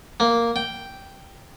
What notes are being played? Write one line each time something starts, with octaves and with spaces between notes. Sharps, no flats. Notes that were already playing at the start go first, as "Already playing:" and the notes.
A#3
G5